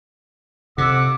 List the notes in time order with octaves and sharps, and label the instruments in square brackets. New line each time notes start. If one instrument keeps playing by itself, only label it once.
[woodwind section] F2 F#5 E6 [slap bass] C3 [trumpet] D6